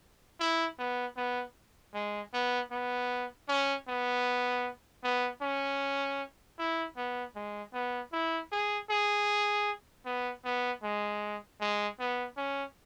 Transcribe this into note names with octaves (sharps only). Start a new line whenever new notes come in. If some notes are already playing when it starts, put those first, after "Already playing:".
E4
B3
B3
G#3
B3
B3
C#4
B3
B3
C#4
E4
B3
G#3
B3
E4
G#4
G#4
B3
B3
G#3
G#3
B3
C#4